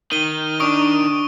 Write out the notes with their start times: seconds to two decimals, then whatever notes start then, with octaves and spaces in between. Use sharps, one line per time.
0.12 D#3 D#7 G7
0.60 D4 C#6 D#6 D7